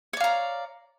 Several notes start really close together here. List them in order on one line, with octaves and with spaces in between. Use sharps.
C#5 D5 F5 A#5